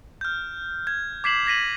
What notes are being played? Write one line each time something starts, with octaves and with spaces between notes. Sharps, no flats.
F6 G6
G#6
D6 G#6 B6 C7 E7 F#7
G#6 A#6 B6 D#7 F#7